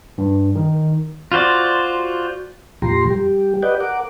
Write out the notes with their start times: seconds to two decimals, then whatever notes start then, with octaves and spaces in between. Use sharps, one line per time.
0.18 G2
0.55 D#3
1.32 F4 F#4 C5 D5
2.82 F2 A#2 F3 G4 A#5 C6
3.11 G3 G4
3.63 G4 B4 D5 D#5 F#5 G5
3.80 A#4 F#5 D6